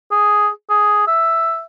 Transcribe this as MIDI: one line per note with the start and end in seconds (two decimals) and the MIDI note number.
0.11 0.49 68
0.70 1.04 68
1.07 1.63 76